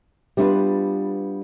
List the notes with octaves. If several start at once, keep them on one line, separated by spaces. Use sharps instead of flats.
G3 B3 D4 E4 F4 B4